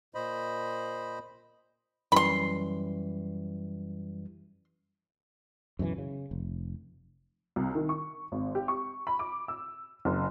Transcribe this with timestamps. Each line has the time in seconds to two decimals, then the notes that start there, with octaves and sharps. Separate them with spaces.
0.15 A#2 C5 D#5 B5
2.12 F#2 E3 G3 B5 C6
5.79 F#2 B2 D3 E3
5.98 C#3
6.31 F1
7.56 C2
7.75 D#3
7.89 C#6
8.32 G#1
8.55 G4
8.68 C#6
9.07 B5
9.19 D6
9.48 E6
10.05 F#1